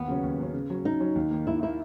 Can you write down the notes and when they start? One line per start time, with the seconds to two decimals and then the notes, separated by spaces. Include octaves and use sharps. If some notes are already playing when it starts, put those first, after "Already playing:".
Already playing: D#2 B3
0.08 C#3 F#3 C#4
0.23 D#2
0.38 C#3 F#3 C#4
0.54 C#3
0.70 F#3 C#4
0.85 C#3 D#4
1.00 F#3 C#4
1.15 D#2
1.31 D#3 A#3
1.47 D#2 E4
1.62 D#3 A#3 E4